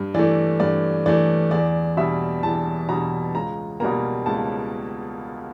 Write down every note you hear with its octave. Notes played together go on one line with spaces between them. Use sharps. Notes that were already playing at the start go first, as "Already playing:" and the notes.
Already playing: G2
E3 A3 D5
G2 D5
E3 A3 D5
E2 D5
B2 G3 E5
E2 A5
B2 G3 A#5
C#2 A#5
B2 G3 A#3 A#5
C#2 A5